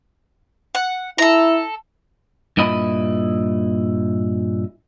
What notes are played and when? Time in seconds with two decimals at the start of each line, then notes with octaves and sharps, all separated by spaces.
0.75 F#5
1.18 E4 A4 A#5
2.57 G2 A#2 E4 D#5 B5